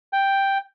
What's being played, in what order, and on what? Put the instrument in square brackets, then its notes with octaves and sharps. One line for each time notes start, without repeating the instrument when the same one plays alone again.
[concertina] G5